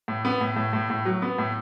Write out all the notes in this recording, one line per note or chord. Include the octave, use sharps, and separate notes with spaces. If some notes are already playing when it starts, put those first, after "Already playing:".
A2
B3
A2
A2
A2
A2
F#3
B3
A2